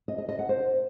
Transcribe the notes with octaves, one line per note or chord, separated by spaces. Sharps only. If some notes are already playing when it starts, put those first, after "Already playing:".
D#5
D#5
D#5
F#5
C5